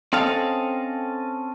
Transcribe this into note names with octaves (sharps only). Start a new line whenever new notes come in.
C4 C#4 A4 D#5 F5